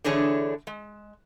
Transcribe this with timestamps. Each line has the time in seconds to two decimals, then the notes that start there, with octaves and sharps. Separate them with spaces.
0.04 D3 E3 A3 D4 G#4 C#5
0.67 G#3